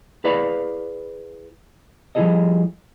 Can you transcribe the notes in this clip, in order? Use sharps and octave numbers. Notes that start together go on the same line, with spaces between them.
E4 G#4 B4 D5 F5 B5
F3 G3 E4 G#4 A4 D#5